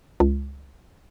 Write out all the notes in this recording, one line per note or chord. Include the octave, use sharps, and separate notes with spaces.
C#2